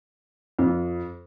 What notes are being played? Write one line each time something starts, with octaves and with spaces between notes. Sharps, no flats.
F2